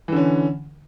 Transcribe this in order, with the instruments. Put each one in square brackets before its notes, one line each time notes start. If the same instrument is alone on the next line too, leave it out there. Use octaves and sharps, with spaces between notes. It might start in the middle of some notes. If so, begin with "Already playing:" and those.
[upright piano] E3
D3
C#4